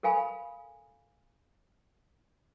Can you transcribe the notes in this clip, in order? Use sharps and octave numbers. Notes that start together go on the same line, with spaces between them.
A4 A#4 F5 G#5 B5